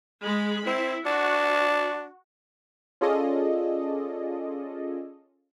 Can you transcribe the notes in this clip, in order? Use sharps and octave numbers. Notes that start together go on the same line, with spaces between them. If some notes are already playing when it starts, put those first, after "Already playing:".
G#3 B5
C4 E4
D4 F#4
C#4 F4 G#4 A4 D5 D#5